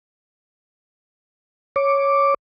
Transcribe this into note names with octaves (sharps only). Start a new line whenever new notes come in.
C#5 D6